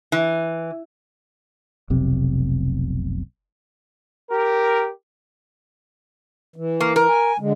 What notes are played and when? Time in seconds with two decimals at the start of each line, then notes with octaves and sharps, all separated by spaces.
0.12 E3
1.90 F1 B1 C3
4.31 G4 A#4
6.56 E3
6.80 A#3
6.96 A#4
7.08 G#5
7.40 D3 G#3